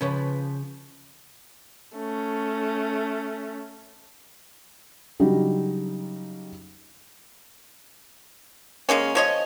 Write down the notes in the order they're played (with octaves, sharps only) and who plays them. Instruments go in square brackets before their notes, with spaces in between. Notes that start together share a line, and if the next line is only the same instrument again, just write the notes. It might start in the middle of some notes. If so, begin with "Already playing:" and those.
[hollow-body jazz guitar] C#3 [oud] F3 B4 C#5
[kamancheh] A3 C#4
[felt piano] C#3 F#3 G3 D4 D#4
[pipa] C#3 G#3 A#3 C#4
F3 C#5 D#5